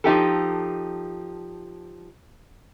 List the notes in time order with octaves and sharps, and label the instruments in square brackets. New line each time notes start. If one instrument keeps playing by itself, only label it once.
[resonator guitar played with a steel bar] F3 D#4 G4 A4